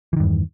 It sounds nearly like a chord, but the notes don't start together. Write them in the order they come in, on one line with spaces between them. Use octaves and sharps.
E3 D#3 G2 E2